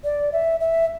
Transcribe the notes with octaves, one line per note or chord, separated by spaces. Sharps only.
D5
E5
E5